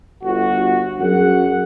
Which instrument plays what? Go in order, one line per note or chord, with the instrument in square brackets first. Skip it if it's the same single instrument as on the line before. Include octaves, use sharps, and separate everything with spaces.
[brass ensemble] G1 F#4
F#2 F#3 G#4 F#5